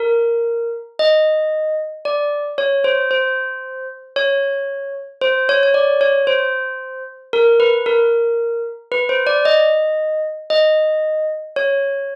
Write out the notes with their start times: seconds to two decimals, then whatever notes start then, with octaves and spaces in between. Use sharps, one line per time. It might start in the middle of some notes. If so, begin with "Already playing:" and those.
Already playing: A#4
0.99 D#5
2.05 D5
2.58 C#5
2.84 C5
3.11 C5
4.16 C#5
5.21 C5
5.49 C#5
5.63 C#5
5.74 D5
6.01 C#5
6.27 C5
7.33 A#4
7.60 B4
7.86 A#4
8.92 B4
9.09 C5
9.27 D5
9.45 D#5
10.50 D#5
11.56 C#5